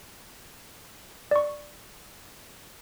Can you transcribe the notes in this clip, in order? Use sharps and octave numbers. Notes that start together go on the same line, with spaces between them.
D5 C#6